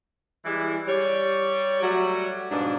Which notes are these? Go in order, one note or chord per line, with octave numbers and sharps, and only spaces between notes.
E3 G3 G#3 E4
G3 C#5
F#3 G3 A3 F#4
G#2 B2 F3 D4